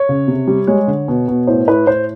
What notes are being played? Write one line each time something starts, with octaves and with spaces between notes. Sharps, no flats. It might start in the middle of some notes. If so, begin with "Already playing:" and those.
Already playing: C#5
C#3
C3
G3
G#3 C#5
D3
B2
B2
A2 C5
A2 B4
A2 C5